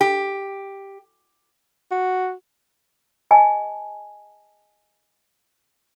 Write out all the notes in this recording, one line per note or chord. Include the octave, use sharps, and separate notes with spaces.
G4
F#4
G#4 D#5 G#5 A5